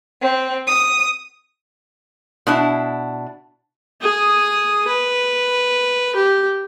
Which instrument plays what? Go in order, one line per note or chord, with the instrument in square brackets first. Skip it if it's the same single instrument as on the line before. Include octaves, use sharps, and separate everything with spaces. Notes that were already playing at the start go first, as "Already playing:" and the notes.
[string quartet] C4
D#6
[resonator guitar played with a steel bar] B2 D4 E4
[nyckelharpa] G#4 D#6
B4
G4